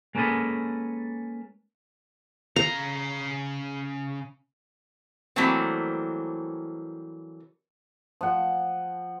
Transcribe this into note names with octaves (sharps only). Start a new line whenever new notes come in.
G#3 A#3 C#4 A4 B4 D#5
C#3 F5 A#5
E3 F#3 G3 A3 A#3 C4
F3 F#5